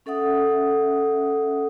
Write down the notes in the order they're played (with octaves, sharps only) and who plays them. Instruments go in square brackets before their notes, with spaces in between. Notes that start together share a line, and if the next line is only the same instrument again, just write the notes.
[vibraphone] C#4 A4 E5 F#5 D#6